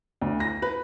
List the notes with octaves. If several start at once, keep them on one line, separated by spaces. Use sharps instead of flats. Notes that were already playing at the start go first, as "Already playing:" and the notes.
D2
A#6
B4